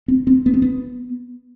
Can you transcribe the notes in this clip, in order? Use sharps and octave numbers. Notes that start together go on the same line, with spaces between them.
C4
C4
B3
C4
B3